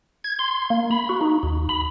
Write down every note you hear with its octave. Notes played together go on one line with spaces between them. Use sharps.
G#6
C6
A#3
B5
F#4
D#4
D#2
B5